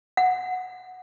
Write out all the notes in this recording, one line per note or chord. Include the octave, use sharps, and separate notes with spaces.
F#5